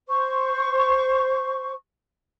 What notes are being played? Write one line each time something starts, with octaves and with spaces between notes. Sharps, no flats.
C5 C#6